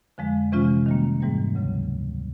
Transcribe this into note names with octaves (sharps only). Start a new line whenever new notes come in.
F2 D3 F3 G#3
C3 E3 G#3 C#4 F4
D#3 G3 A#3
G#2 E3 G3 A#3
D2 C#3 F#3